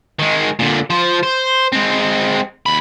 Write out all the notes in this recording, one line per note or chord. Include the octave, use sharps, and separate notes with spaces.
D#3 G#3
A#2 D3
F3 C5
C5
G#3 C4
D#2 B5